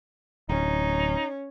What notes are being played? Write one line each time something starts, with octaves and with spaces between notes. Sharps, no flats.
D1 C#4 D#4